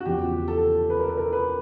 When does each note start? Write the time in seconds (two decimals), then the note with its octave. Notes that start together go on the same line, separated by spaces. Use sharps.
0.01 F#4
0.05 E2 C#3 F3 G4
0.48 A4
0.90 B4
0.99 A#4
1.09 A4
1.18 A#4
1.33 B4